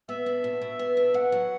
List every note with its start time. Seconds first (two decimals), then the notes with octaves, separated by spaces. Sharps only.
0.08 B3 E5
0.26 D4
0.44 B2
0.62 B2
0.79 B3
0.97 D4
1.14 B2 F#5
1.32 F#3